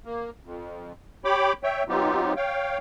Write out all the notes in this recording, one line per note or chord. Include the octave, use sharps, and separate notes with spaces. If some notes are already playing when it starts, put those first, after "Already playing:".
A#3
F2
G4 C#5 G5 B5 D6
C#5 E5 G5
F#3 B3 C4 D#4 F4 G4
C#5 F5 G5